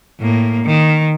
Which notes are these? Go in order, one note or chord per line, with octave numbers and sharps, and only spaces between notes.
A2 A#3
D#3